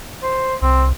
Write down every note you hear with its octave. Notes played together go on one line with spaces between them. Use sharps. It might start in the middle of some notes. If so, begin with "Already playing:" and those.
C5
C2 C4